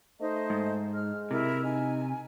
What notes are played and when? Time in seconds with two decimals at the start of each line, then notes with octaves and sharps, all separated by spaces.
0.20 A3 D#4 C5 D#5
0.50 G#2
0.94 G#3 F6
1.31 C3 E4 A#4
1.64 D#4 G#5